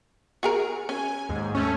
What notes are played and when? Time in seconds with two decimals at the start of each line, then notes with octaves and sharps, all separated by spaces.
0.43 F#4 G#4 A#4
0.89 C#4 G#5
1.29 D#2 G#2
1.55 A3 C#4